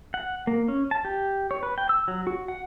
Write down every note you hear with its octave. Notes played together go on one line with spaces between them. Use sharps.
F#5
A#3
C#4
A5
G4
C#5
B4
G5
E6
F#3
F#4
F#5